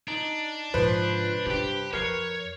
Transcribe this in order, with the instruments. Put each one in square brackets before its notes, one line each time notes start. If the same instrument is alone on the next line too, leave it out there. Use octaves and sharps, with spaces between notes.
[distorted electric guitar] D4 [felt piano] D#4
[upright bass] G#2 C3 [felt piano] F3 [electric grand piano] B4 C5
[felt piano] G2 G3 [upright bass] C3 [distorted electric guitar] G4 G5
[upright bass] F2 [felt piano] A#4 F6 C7 [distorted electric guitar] C#5